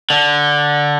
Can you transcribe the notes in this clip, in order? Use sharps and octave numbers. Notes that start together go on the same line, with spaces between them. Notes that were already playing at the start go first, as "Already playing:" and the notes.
D3